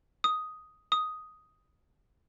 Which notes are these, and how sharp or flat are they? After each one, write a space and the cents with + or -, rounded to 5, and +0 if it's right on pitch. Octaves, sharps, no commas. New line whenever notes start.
D#6 +5
D#6 +5